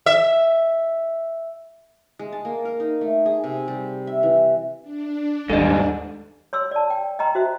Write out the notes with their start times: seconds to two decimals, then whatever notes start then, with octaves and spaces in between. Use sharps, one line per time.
0.06 E5
2.19 G#3
2.32 A5
2.45 A#3
2.65 A#4
2.80 D#4
3.01 A3
3.26 G#4
3.44 C3
3.68 G3
4.07 E5
4.23 E3
4.82 D4
5.50 D#2 G#2 G3 B3 A4 D#5
6.53 C#5 C6 E6
6.71 D5 A5
6.90 G5
7.19 D#5 G5 A#5 C6
7.35 F#4 C5 E5